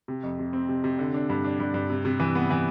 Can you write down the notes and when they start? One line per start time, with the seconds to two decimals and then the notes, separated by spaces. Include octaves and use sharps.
0.08 C3
0.23 F2
0.39 C3
0.53 C4
0.69 C3
0.84 C3
0.99 D3
1.14 D4
1.29 G2
1.44 D4
1.60 G2
1.74 G2
1.90 C3
2.05 C3
2.20 E3
2.35 B3
2.50 E3